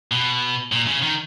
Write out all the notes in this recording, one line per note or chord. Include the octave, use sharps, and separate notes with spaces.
B2
A#2
C#3
D#3